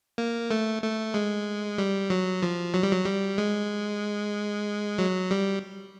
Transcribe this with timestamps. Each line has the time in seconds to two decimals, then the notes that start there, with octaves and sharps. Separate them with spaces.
0.18 A#3
0.51 A3
0.83 A3
1.14 G#3
1.78 G3
2.10 F#3
2.43 F3
2.74 F#3
2.83 G3
2.92 F#3
3.06 G3
3.38 G#3
4.98 F#3
5.31 G3